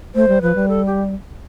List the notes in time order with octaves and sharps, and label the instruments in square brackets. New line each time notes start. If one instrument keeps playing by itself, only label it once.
[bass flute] A3 [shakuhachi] C5
[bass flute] G3
[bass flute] F3 [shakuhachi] B4
[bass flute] G3
[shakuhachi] A4
G4